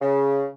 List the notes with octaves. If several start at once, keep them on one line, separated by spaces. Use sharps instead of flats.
C#3